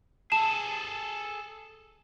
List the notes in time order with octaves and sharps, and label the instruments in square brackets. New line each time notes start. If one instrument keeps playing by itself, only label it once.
[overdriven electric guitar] G#4 A4 [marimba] A5 [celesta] E7